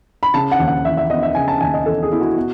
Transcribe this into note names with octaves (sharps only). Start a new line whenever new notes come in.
B5
C#3 A5
F#5
D#2
F#5
E3 E5
E5
B3 D#5
E5
C#3 G#5
A5
D#2 G#5
D#5
E3 A4
G#4
B3 E4
F#4
B2 F#4